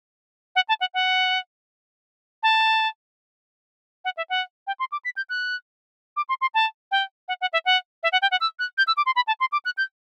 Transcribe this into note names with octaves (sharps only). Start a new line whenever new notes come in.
F#5
A5
F#5
F#5
A5
F#5
E5
F#5
G5
C6
D6
B6
G6
F#6
D6
C6
C6
A5
G5
F#5
F#5
E5
F#5
E5
F#5
G5
F#5
E6
F#6
G6
E6
D6
C6
B5
A5
C6
D6
F#6
G6